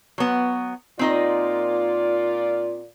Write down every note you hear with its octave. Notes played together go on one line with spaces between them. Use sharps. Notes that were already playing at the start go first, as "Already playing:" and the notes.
F#3 B3
A#2 C4 D#4 F4 D5 D#5